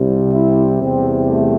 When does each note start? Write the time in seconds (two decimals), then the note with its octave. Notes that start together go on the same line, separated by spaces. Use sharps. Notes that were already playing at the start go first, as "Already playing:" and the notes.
Already playing: C2 C3 G3
0.34 E4
0.80 E2 C3 G3 C4
1.26 A3